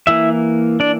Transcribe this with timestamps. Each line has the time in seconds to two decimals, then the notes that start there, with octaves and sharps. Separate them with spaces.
0.07 E3 A#3 E4 E5
0.80 D4 D5